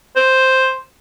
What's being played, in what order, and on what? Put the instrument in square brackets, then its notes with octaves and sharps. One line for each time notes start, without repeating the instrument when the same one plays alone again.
[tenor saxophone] C5